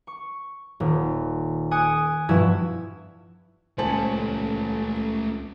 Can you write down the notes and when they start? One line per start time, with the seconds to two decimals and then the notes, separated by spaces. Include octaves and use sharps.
0.07 C#6
0.80 D#1
1.71 G#5 D#6 F#6 C#7 D7
2.29 G2 B2 F3 E4 E6 G#6
3.78 D#1 C#2 A3 C#4 C5 G#5 A5 F#7